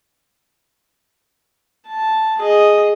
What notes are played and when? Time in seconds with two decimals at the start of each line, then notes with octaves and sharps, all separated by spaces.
1.88 A5
2.39 G#4 D#5